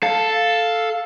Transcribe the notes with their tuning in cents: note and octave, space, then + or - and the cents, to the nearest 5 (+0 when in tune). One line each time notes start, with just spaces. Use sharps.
A4 +0 F5 +0